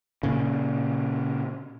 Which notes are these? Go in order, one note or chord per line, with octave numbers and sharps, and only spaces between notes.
A#2 C#3